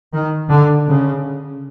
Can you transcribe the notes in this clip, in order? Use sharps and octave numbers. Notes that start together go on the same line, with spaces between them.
D#3
D3
C#3